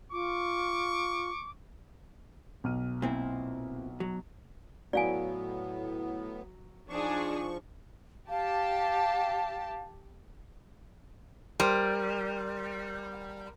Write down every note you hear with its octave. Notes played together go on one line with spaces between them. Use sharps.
F4 C#6 D6
B1 F6 D#7
A#2 C4 E4
F#3
A2 F#3 B3 D5 F5 G#5
F3 D4 D#4 G#4 C#6
G4 F5 A5
G3 A#4 C5 C6